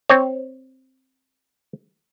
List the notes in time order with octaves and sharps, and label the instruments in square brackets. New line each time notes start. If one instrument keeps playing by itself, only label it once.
[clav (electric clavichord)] C4 C#5